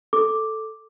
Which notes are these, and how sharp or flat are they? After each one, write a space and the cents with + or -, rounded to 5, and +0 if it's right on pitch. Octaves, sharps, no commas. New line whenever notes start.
A4 +0 D6 +0